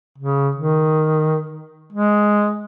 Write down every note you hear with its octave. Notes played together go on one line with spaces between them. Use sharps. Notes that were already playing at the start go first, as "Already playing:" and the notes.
C#3
D#3
G#3